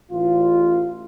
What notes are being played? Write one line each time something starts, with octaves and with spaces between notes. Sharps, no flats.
A1 F4